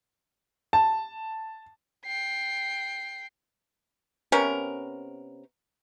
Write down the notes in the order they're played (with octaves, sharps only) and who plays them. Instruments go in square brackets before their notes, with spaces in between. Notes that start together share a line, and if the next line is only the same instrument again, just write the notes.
[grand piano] A5
[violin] G5 C7
[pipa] C3 B3 C#4 A#4